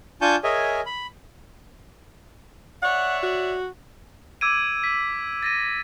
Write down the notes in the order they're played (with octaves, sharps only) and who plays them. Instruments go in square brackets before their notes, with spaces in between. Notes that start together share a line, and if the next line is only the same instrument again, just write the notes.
[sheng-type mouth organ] D4 F4 G#5 A5 C#6 G6
G#4 A#4 C#5 D#5 E5 G#5
B5
[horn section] C#5 D5 E5 [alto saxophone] F#5
[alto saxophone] F#4
[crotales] D6 E6 G#6 D7 D#7
B6
A6 A#6 D#7